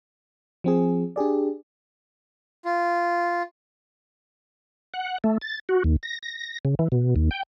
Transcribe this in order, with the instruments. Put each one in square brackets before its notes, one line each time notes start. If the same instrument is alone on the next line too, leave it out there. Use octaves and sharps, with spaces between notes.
[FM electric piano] F3 C4 G#4
D4 G4 G#4 D5
[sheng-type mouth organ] F4
[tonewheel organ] F#5
A3
A6
F#4
D#2
A#6
A#6
C#3
E3
B2
D#2
G5